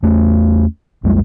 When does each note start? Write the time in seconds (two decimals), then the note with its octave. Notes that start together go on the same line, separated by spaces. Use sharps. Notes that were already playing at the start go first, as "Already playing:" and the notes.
0.03 E2 A3 C#4
1.03 B1 F2 G3 G#3